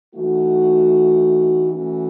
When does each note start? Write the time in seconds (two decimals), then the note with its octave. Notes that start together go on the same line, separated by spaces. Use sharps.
0.15 E3 A3 D#4 F#4
1.72 E3 A3 C#4 F#4